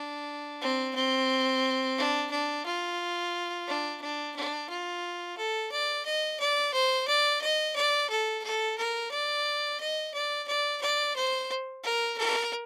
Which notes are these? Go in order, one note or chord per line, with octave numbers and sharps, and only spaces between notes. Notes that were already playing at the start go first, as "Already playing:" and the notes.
Already playing: D4
C4
C4
D4
D4
F4
D4
D4
D4
F4
A4
D5
D#5
D5
C5
D5
D#5
D5
A4
A4
A#4
D5
D#5
D5
D5
D5
C5
A#4
A#4